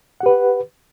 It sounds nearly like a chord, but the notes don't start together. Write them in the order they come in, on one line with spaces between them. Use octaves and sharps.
F#5 G4 B4